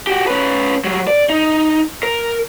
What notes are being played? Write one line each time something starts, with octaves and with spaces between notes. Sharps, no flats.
F#4 G4
C#4 B4
F#3 G3
D5
D#4
A#4